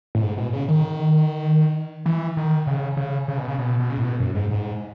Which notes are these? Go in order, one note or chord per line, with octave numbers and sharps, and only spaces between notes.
A2
G#2
B2
C#3
D#3
E3
D#3
C#3
C#3
C#3
B2
C#3
B2
B2
C#3
A2
B2
F#2
G#2
G#2